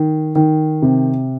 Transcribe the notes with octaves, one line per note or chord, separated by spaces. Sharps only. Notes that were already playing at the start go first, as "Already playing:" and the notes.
Already playing: D#3
D#3
C3